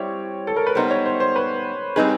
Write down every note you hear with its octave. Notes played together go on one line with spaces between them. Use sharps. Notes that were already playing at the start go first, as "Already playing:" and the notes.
Already playing: G3 C4 E4 C#5
A4
A#4
B4
G3 B3 D#4 C5
C#5
C5
C5
B4
G3 C4 D#4 G#4 B4